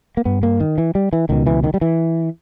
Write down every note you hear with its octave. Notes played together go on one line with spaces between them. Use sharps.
A#3
G2 B3
A#3
D#3
E3
G3
E3
C#2 B2 D#3
E3
D#3
G3
E3